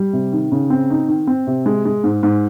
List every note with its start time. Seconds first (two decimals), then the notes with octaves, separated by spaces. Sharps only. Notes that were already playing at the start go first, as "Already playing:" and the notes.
Already playing: G3
0.13 C3
0.32 D#3
0.52 C#3
0.70 C4
0.90 D#4
1.08 D#3
1.27 C4
1.47 C3
1.66 G#3
1.85 G#3
2.04 G#2
2.23 G#2